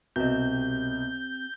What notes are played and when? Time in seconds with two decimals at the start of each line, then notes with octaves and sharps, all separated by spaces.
0.16 C2 B2 C4 G4 D#5 G6